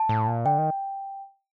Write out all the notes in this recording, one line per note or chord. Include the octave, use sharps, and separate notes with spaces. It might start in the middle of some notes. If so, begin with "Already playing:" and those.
Already playing: A5
A2
A#2
D3 G5
D#3